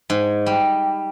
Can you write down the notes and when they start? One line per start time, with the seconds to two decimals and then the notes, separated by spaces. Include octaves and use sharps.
0.10 G#2
0.46 G3